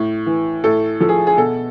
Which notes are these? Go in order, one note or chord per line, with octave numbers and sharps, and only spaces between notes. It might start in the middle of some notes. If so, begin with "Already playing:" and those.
Already playing: A2
E3
A2 A4
F3 A4
G#4
G#4
B2 A4